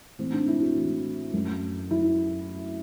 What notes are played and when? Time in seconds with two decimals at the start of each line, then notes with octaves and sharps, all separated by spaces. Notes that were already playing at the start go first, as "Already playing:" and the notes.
0.18 A2 E3 A3 C4
0.33 D4
0.48 E4
0.62 F#4
0.76 A2 E3 A3
1.33 F#2 F#3 A3
1.91 F#3 A3 E4